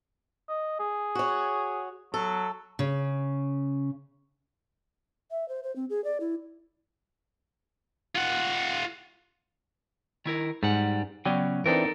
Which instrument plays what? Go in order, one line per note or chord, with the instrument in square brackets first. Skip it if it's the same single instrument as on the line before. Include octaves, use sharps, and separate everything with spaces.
[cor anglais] D#5
G#4
[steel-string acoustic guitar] F#4 C#5
[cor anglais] F#3 [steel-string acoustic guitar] A4
[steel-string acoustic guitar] C#3
[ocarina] E5
C5
C5
C4
G#4
D5
E4
[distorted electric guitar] F4 F#5
[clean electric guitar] D#3 E4 A#4
[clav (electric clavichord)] G#2 [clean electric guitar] G3 F#5
[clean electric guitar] C#3 B3 C#4 [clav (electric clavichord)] F#3 D5 G5
[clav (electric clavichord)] E3 C4 D4 [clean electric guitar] D#4 A4 A#4